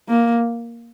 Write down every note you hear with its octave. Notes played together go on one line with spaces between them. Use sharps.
A#3